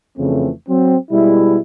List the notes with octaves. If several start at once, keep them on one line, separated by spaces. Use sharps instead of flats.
F2 C#3 E3 A3 C4
F#3 C4
B2 G3 G#3 E4